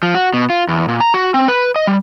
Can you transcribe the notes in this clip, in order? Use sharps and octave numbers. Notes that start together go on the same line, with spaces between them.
F3
F#4
B2
F4
E2
A#2
A#5
F#4
C4
B4
D#5
G3